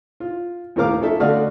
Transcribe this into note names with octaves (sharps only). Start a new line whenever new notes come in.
F4
D#2 A2 D#3 A#4 F5 D6
F3 C#4 D#4 A4 E5
D3 A3 F#4 D5 D#5 F5